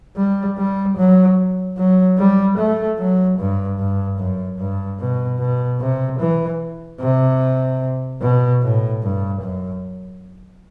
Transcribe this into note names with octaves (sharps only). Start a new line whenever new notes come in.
G3
G3
F#3
F#3
G3
A3
F#3
G2
G2
F#2
G2
B2
B2
C3
E3
C3
B2
A2
G2
F#2